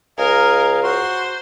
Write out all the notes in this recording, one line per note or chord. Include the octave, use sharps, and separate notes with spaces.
C#2 A#4 D#5 F5 G#5
F#4 C5 C6